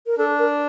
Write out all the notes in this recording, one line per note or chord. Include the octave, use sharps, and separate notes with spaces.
A#4
D4 A4
A#4